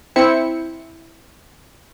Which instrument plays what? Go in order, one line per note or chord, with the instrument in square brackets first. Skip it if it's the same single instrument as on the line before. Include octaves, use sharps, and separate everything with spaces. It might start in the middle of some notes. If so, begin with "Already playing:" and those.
[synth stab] C4 E4 C#7